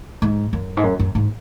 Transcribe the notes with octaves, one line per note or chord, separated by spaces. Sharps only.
G#2
F#2
G#2
F#2
F#2
G#2